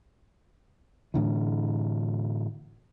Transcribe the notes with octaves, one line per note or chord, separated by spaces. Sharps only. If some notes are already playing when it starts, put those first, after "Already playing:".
A2 D3 E3